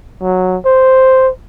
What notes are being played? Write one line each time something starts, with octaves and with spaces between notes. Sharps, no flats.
F#3
C5